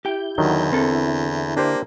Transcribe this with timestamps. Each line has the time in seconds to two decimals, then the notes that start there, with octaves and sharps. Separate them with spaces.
0.05 E4 G4 G5 G6
0.38 E2 D3 D#3 F#3
0.72 D3 C4 E4 A4 A#4
1.57 A#3 D4 G4 C5